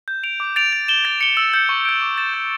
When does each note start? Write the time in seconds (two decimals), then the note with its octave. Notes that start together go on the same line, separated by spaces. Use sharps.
0.08 G6
0.23 D7 F7
0.40 D6
0.56 A6 D7 F7
0.73 A6
0.88 E7 G7
1.05 A6
1.21 C#7 G7
1.37 E6
1.54 G6 C#7
1.69 C#6
1.85 G6 D7
2.02 D6
2.18 A6 E7
2.34 G6